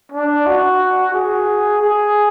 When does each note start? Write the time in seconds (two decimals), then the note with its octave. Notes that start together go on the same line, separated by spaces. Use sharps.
0.12 D4
0.47 F#4
1.14 G#4
1.82 G#4